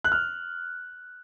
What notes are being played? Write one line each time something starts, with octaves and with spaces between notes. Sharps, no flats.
F#6
F6